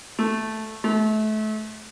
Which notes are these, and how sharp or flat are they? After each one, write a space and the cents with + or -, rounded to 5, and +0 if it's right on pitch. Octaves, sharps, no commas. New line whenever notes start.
A3 -5
A3 -30